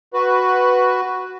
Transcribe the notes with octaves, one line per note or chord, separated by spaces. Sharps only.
F#4 B4